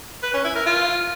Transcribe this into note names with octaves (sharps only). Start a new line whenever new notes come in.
B4
C#4
E4
A#4
F4